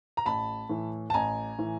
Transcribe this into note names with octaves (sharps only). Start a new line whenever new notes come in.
A#5
A1 A5 B5
A2 E3
A5
A1 G#5 A#5
A2 E3